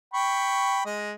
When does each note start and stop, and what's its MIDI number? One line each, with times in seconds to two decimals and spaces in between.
0.14 0.81 79
0.14 0.81 83
0.14 0.81 85
0.85 1.13 56
0.85 1.13 75